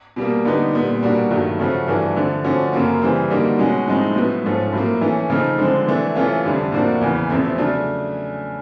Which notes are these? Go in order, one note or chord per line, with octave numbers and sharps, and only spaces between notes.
B2 G3 A#3
D3 G3 B3 D#4
A#2 G3 B3
B2 G3 A#3 D4 F#4
G2 D#3 F#3 A3
C#3 F3 A3 C#4 F#4
G2 E3 A3 D4 F#4
D3 F3 A3
D3 F3 A3 C#4 F#4
F#2 C#3 F#3 A#3
C#3 E3 G3 C4
D3 G3 A#3 D#4 F#4
B2 G#3 C#4 F#4
A2 F3 G#3 C4 D#4
A2 F#3 B3
G#2 F3 A3 C#4
A2 F#3 A#3
E3 A3 C#4
C#3 F3 A3 C4 D#4
D3 F3 G#3 C4
C3 E3 A3 D4
C3 E3 A3 C#4 F4
F2 D3 G3
A2 F3 A#3 D4 F#4
E2 C#3 E3
E2 C3 F3 A3 C4
C#3 F#3 A3 D4